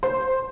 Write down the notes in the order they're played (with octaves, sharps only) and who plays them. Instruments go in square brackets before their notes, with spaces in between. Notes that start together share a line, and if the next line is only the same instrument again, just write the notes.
[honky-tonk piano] C5